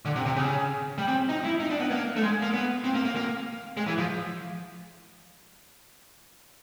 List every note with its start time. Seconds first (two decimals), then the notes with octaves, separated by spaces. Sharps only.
0.05 D3
0.16 C3
0.26 C3
0.36 C#3
0.98 G3
1.08 C4
1.29 D#4
1.44 E4
1.60 D#4
1.71 D4
1.80 B3
1.91 A#3
2.16 A3
2.22 G#3
2.43 A#3
2.54 B3
2.84 C4
2.95 A#3
3.06 A#3
3.16 A#3
3.77 G#3
3.87 E3
3.98 F3